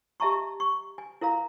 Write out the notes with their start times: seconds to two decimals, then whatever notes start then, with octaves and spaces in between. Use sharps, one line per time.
0.20 G4 D#5 E5 A5 A#5 C#6
0.60 C#6
0.98 G#5
1.21 E4 A#4 F5 A#5